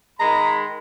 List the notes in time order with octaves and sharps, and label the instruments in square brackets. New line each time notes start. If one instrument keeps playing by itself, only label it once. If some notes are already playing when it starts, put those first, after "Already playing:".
[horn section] D#3 G#3 B5 [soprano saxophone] A#5